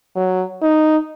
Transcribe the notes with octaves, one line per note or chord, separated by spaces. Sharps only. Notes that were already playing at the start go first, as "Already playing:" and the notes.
F#3
D#4